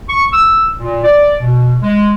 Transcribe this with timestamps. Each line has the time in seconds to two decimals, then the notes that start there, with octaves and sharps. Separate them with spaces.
0.09 C#6
0.33 E6
0.80 A#2
1.04 D5
1.40 B2
1.82 G#3